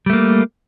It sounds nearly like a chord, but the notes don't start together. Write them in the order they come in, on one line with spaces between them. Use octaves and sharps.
G3 A3 A#3